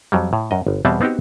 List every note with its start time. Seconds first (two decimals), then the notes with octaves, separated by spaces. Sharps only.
0.12 F2 F#3 G3
0.33 A2
0.51 F#2 D#5
0.67 G1
0.85 E2 B2 G3 B3 C4 A5
1.01 B3 C4 D#4 F#4 G4